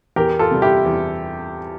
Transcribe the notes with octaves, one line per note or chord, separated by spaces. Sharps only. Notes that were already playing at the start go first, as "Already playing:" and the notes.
E2 G4 A#4
F4 A4
C3 G3
E4 G4
E2